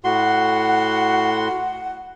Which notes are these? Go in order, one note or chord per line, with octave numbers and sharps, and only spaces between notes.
A2 F#4 F#5 C6